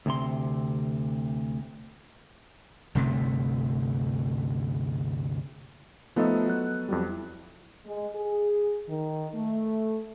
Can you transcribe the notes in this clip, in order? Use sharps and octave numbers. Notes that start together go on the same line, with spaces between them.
D2 C3 C6
G1 D2 C3 A3
F3 A3 B3 D#4 A4 D#5
F#3 F#6
F2 F#3 G3
E4
G#3
G#4
D#3
A3